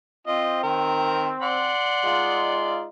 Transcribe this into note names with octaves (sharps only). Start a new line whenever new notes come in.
C4 F4 D#5
D#3 A#4
D5 F#5 C6
G#3 D#4 F4